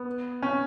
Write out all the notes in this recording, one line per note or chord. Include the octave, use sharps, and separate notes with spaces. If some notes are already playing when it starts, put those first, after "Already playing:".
Already playing: B3
C#4